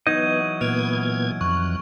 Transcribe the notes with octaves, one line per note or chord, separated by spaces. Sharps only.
E3 F#3 B3 D#4 D#5 G#6
A#2 B3 F6 G#6 D7 F7
F2 C#6 F#6